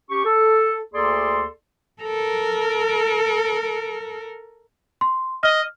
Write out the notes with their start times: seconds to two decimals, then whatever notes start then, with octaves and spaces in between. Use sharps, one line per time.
0.10 C#4 G4 C#6
0.25 A4
0.94 D2 A#3 G#4 A4 D5 C6
2.02 A4 A#4
5.01 C6
5.43 D#5 F6